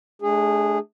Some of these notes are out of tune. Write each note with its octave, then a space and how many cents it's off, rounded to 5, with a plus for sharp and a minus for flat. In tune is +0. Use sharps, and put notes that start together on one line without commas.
A3 -40 D4 +0 G#4 -15